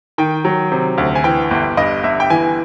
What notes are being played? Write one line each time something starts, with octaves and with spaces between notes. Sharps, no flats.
D#3 G5
F#3
C3
D2
G#5
E3 G5
G1
G2 D#5
G1 E5
G5
E3 G#5